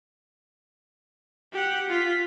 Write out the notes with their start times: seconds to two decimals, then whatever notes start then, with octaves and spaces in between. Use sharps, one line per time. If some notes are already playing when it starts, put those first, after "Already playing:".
1.52 G4 F#5
1.89 F4 B6